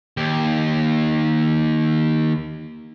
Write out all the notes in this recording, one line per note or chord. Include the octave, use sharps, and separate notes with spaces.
D#2 G4